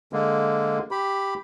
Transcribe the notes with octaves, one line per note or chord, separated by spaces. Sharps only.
D3 G#3 A#3
G4 B5